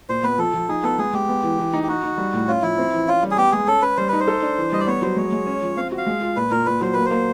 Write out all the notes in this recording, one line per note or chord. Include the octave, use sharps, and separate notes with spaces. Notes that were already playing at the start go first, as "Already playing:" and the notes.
A#2 C5
B3 B4
F3 A4
F3
D#4 G#4
B3 A4
G#3 G#4
G#3 G4
B3
E3
E3
D#4
G4
D#4 F#4
D#4
G3
A2
C#4 F4
F3 E4
C4
E3
C#4 F4
G3
G#4
B3 G4
G#3 G#4
C#4 A4
C#4 B4
G3 C5
D#4 B4
C5
A4
D4
E3
G3 D#5
D5
B3 C#5
F#3 C5
G#3 C#5
G#3
C#4
F3
C4 F5
F#4
F5
G#3
F4
A#2 B4
A#2 A#4
A#2 B4
F#3 C5
A#3 B4
C5
A#3